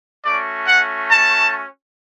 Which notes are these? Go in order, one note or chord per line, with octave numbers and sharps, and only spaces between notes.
A3 C#4 F#4 D5
F#5
A5